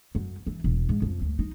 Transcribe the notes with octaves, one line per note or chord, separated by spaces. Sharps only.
F#2
E3
E1
G#2
F2
D2
D#4